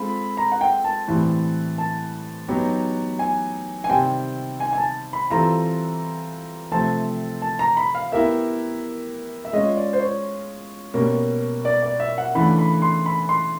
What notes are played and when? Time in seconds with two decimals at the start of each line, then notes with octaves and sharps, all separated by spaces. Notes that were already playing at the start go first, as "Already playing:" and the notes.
Already playing: G#3 C4 F4 A4 B5
0.37 A#5
0.52 F#5
0.61 G5
0.84 A5
1.08 A2 E3 G3 C4
1.78 A5
2.48 F#3 B3 D#4 G4
3.19 G#5
3.84 G#5
3.89 C3 D#3 G3 C4 G5
4.60 G#5
4.73 G#5
4.78 A5
5.13 B5
5.30 E3 G3 C4 F4 A4 A#5
6.72 C3 F3 A3 C4 A5
7.42 A5
7.59 A#5
7.77 B5
7.95 F5
8.12 B3 E4 G4 A#4 E5
9.45 E5
9.53 G#3 C#4 F4 D#5
9.77 D5
9.93 C5
10.00 C#5
10.94 B2 G3 A#3 C#4
11.65 D5
11.83 D5
12.00 E5
12.18 F#5
12.35 C#3 E3 A3 D4 B5
12.59 B5
12.82 C6
13.06 B5
13.29 C6